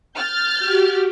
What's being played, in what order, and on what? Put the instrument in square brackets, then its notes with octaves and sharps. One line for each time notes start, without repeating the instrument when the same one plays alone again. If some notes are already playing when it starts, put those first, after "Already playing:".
[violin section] F6 G6 A6
[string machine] F#4 G4